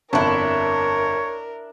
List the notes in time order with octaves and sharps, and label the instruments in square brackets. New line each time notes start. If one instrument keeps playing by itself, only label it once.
[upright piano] G1 F2 [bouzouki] D4 E4 [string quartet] A#4 [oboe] C#5